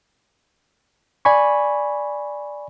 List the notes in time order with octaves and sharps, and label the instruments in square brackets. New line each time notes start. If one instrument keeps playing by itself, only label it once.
[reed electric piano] D5 G#5 B5 C#6